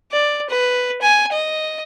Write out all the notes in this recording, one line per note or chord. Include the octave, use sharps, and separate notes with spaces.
D5
B4
G#5
D#5